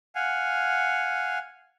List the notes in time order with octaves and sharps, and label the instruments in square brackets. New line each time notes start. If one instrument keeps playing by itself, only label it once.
[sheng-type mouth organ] F5 F#5 G#5